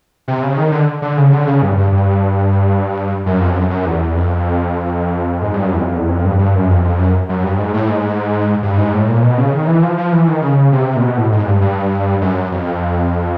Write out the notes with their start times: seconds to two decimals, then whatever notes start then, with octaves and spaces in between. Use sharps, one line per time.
0.28 C3
0.43 C#3
0.57 D#3
0.71 D3
1.02 D3
1.17 C#3
1.32 D3
1.47 C#3
1.62 G2
1.77 G2
1.92 G2
3.26 F#2
3.41 F2
3.56 F#2
3.70 F#2
3.86 E2
4.15 F2
5.42 G#2
5.54 G2
5.64 F#2
5.73 E2
5.80 F2
5.95 E2
6.09 F2
6.25 G2
6.39 G2
6.55 F#2
6.70 F2
6.84 F2
6.98 F#2
7.29 F#2
7.43 G2
7.58 G#2
7.74 A2
7.88 G#2
8.63 G2
8.77 G#2
8.93 A2
9.08 A#2
9.23 B2
9.38 C#3
9.53 D#3
9.67 E3
9.83 F3
9.97 F3
10.12 E3
10.28 D#3
10.42 C#3
10.72 C3
10.96 A#2
11.02 B2
11.17 A2
11.32 G#2
11.47 G2
11.61 G2
12.21 F#2
12.52 F2